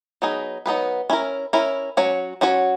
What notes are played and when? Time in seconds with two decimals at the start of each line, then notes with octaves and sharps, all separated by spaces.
0.22 F#3 B3 D#4 G#4 B4
0.66 F#3 B3 D#4 G#4 B4
1.10 C#4 E4 A#4
1.53 C#4 E4 A#4
1.97 F#3 C#4 F#4 C#5
2.41 F#3 C#4 F#4 C#5